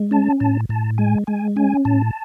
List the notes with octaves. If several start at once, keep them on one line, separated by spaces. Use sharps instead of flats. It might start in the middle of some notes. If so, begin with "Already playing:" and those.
Already playing: G#3
C#4 A5
A2 A5
A2 A5
G#3 G#5
G#3 G#5
C#4 G#5
A2 A5